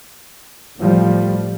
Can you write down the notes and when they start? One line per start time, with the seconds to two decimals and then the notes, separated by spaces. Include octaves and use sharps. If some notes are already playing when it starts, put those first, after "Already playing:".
0.78 A2 F3 G3